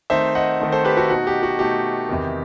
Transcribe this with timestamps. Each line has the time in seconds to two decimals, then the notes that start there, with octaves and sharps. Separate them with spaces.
0.10 D#3 A3 C4 D#4 C5 E5
0.35 D#5 F#5
0.60 D#3 A3 C4 D#4
0.72 A4 C5
0.85 G4 B4
0.97 F#4 A4
1.10 B2 A3 D#4 F#4
1.27 G4
1.43 F#4
1.59 B2 A3 D#4 G4
2.09 E2 C3 D#3